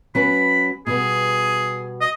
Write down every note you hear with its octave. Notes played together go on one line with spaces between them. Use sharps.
F#3 C#4 B4 B5
B2 G3 B3 G#4
D#5